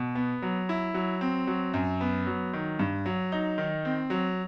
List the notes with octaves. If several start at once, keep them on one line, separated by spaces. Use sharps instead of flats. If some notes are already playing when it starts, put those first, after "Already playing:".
Already playing: B2
B3
F#3
E4
F#3
C4
F#3
F#2
B3
F#3
D#3
G2
F#3
D#4
D#3
C4
F#3